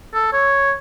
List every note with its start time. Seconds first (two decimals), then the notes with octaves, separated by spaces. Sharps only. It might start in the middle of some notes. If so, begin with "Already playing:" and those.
0.14 A4
0.33 C#5